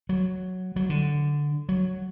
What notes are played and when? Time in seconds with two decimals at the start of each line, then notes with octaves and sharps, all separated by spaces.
0.09 F#3
0.76 F#3
0.90 D3
1.69 F#3